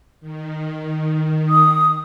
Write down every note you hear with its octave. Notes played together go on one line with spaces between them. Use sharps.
D#3
D#6